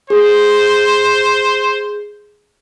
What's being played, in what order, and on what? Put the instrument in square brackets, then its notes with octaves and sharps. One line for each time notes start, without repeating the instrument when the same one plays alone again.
[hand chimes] G#4 [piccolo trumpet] C5